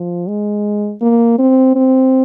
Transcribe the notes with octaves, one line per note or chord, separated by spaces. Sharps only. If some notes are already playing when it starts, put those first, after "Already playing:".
Already playing: F3
G#3
A#3
C4
C4